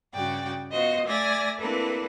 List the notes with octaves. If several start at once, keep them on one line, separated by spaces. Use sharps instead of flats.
G2 C#3 F#4 D5 G5
B3 F4 F#4 C5 D#5
A3 D5 E5 G#5 A6 A#6
A#3 C4 D4 E4 A4 B4